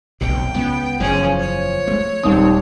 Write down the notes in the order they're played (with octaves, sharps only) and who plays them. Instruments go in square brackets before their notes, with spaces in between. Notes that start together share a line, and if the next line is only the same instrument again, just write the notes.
[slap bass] F1 B2 [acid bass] B1 [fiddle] G5
[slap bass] C#2 [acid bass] B3
[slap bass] F#1 E2 [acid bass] F3 [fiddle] C#4 G#4
[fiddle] C#5
[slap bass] G#3 A3
[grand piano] D#1 D#2 D#6 [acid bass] C4